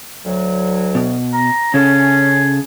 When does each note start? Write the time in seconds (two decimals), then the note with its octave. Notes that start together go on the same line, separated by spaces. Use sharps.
0.25 D2 F#3
0.95 B2
1.34 A#5
1.74 C#3 C#4 G#4 A4